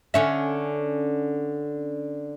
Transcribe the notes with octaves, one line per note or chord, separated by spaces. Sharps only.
D3 C#4 E5